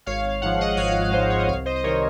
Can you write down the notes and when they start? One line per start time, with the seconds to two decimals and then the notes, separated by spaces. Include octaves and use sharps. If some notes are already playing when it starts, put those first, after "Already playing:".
0.06 G#1 C#5 F5
0.42 G#2 F3 F#5
0.61 D#5 F#5
0.77 G#1 C#5 F5
1.12 G#2 F3 C5 D#5
1.30 C#5
1.39 D#5
1.48 C2 C#5 F5
1.66 C5 D#5
1.76 D#5
1.84 C3 D#3 A#4 C#5